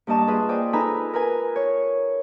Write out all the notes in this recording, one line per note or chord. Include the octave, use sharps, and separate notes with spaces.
G2 A#3 D#5 A5 C#6
F4 G#4 B4 D#5
C5 D5 G5 G#5
D#4 A4 B4 G#5 A#5 B5
A#4 B4 G#5
C#5